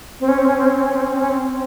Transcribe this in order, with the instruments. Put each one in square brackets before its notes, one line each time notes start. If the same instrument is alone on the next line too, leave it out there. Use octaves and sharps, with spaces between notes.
[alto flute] C4
C#4
C4
C#4
C4
C#4
C4
C#4
C4
C#4
C4
C#4
C4